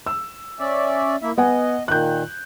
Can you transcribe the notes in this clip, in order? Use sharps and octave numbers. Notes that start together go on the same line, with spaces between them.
E6
C#4 D5 E5
A#3 E4 E5
B3 D#5 F#5 G#5
A#2 D#3 F#6 G6